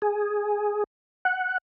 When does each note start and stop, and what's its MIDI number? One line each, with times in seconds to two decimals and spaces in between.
0.02 0.84 68
1.25 1.58 78